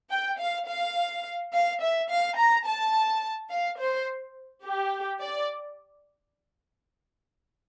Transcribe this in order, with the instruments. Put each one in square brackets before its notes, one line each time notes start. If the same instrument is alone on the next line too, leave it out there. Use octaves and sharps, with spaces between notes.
[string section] G5
F5
F5
F5
E5
F5
A#5
A5
F5
C5
G4
D5